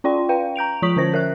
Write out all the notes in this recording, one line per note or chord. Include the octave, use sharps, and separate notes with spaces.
C#4 F4 D5 G5 C6
B4 F5 G5
A#5 G6 D7 F7
F3 F4 C#6 D#6 B6 F#7
D3 C#4 C5 A#6
A#4 E5 F#6